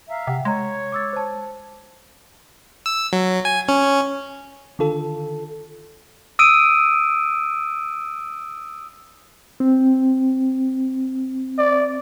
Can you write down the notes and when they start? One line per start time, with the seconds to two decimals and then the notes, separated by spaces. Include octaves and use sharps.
0.09 E5 F5 A#5
0.27 C3 F#5 G5
0.45 G#3 C#5 A#5 G#6
0.92 D6 E6 A6
1.13 C5 A5
2.86 E6
3.13 F#3
3.45 G#5
3.68 C#4
4.79 D3 D#3 F4 A4
6.39 D#6 E6 D7 D#7
9.60 C4
11.58 D5